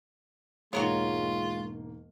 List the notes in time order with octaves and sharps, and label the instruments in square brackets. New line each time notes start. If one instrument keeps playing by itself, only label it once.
[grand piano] E1 G#2 A#3 [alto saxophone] G#3 [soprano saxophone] F4 [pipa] F#4 A#4 C#5